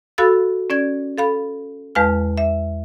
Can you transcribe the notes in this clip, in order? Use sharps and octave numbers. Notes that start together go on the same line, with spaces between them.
F#4 A4 F5 B5 E6 A6
C#4 D5 G#6
A4 F5 B5
E2 G#3 B4 F5 A5 F6
E5